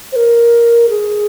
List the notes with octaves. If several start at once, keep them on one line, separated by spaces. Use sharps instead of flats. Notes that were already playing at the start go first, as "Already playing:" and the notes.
C5
A#4
G#4